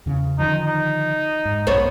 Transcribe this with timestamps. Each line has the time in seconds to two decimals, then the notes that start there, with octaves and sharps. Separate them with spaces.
0.06 E2 C#3
0.39 D3 D#3 F3 D#4
0.66 D#4
1.45 G#2
1.67 B1 F#2 B3 C5 C#5